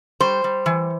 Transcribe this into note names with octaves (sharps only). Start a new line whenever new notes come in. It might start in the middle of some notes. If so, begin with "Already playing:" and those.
G3 C5
G3
E3